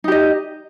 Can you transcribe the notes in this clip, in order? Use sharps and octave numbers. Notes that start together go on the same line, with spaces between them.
D#4 G4 D#5